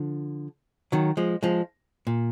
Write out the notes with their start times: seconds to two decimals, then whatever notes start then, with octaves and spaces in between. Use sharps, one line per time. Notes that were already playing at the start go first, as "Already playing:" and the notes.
Already playing: D3 F3
0.92 D#3 F#3
1.17 F3 G#3
1.43 F3 G#3
2.07 A#2